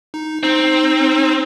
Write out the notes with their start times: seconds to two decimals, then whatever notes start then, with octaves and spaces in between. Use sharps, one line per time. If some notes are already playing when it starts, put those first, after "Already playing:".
0.14 D#4
0.43 C4 D#4